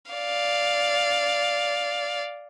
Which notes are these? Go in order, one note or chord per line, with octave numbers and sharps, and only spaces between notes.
D5 F5